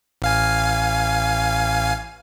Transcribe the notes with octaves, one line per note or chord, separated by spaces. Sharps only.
A1 F5 G#5